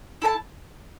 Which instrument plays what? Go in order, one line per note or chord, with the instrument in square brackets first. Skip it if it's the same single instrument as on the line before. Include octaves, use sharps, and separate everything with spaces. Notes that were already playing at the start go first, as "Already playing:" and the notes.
[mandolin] E4 A4 E5 A5